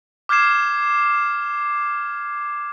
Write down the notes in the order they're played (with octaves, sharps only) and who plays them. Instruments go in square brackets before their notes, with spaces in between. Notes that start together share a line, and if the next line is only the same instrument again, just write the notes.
[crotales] D6 F6 G6 G#6 C7 E7